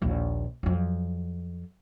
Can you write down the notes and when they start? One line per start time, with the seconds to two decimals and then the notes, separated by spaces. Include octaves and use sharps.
0.02 A#1 D#2
0.63 F2 F#3